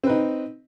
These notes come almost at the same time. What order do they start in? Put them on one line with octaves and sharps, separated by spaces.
C4 B4 D#4